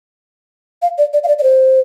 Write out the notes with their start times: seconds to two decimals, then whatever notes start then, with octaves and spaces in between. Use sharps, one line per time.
0.82 F5
0.98 D5
1.13 D5
1.24 F5
1.28 D5
1.39 D5
1.43 C5